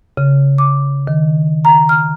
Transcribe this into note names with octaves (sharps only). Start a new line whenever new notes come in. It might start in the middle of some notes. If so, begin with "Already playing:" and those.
C#3
D6
D#3
A#5
F6